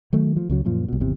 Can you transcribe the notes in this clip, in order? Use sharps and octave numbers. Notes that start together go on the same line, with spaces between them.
D#3 F#3 A3
F3
C#2 C#3 F#3
F#2 A#2 F3
C2 B2
G#1 E2 C3